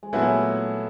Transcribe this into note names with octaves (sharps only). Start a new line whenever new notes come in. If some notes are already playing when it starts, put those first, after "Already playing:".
G#3
A#2 F#3 A3 B3 E4